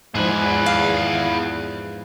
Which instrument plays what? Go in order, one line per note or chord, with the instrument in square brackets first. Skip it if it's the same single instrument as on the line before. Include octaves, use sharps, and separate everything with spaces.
[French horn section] E2 [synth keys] G#2 F3 [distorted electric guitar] G#4 B4
[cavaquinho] F5